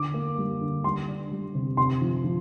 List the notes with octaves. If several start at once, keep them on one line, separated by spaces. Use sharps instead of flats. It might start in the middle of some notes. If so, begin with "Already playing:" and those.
Already playing: D3 D6
A#3
G3
D3
G3 C6
D4
G3
C3
C3 C6
F3
F3